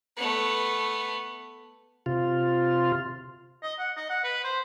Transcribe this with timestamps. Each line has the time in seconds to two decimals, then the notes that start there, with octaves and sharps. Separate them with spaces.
0.17 A3 B3
2.06 C3 F4
3.63 D#5
3.79 F#5
3.97 D#5
4.10 F#5
4.24 B4
4.44 C5